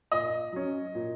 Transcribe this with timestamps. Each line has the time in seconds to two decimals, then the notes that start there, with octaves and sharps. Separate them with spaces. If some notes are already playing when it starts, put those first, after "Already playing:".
0.12 A#2 D#5
0.53 F#3 C#4
0.95 A#2